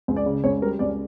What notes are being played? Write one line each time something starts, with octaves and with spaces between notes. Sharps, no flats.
C#2
D5
C#3
C#2 C#5
G3 A#4
C#2 D5